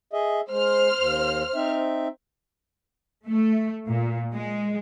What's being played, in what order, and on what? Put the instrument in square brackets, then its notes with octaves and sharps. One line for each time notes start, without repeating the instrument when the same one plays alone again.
[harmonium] G#4 D#5 E5
[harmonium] G#3 [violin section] C5 F6
[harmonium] D#2
C4 D#4 E5
[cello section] A3
A#2
G#3